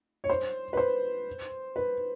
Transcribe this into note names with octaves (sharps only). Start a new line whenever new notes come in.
C#5
C5
B4
C5
B4